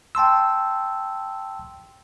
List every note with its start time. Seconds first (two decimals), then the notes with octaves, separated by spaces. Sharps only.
0.15 G5 A5 C6 E6